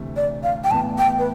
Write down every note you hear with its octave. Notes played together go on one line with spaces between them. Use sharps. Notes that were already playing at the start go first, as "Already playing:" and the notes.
Already playing: D2 C3 E3 A3 C4
D5
F5
G5
A2 E3 B3 E4 A5
G5
B4